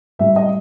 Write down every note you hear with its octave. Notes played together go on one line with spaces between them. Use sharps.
A2 G3 E5
D#5